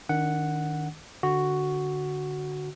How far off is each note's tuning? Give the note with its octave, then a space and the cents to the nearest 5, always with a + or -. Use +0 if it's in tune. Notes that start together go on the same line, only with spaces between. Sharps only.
D#3 -5 D4 -40 F#5 +0
D3 +0 F#4 +0